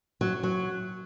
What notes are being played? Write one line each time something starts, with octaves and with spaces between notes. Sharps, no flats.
F#3
F#3